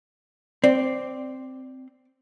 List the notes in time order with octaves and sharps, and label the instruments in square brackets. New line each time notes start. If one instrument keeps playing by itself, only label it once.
[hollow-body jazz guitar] C4 [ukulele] D5